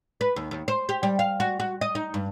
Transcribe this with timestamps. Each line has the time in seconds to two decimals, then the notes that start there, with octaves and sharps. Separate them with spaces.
0.21 B4
0.36 D#2
0.51 D#2
0.68 C5
0.89 G4
1.03 G3
1.19 F5
1.40 F#4
1.60 F#4
1.81 D#5
1.95 D#4
2.14 G2